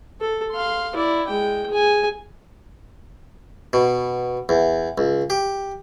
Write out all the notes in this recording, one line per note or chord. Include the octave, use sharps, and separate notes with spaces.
A4
F5 C6
E4 D5
G#3 G5
G#4 G#5
B2
E2
C#2
G4